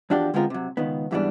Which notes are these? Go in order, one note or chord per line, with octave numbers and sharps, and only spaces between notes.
E2 F3 D4 F#4 G4
D3 G#3 B3 C4 F4 A#4
C3 F#3
C#2 D#3 B3
E2 G#2 E3 G3 B3 D4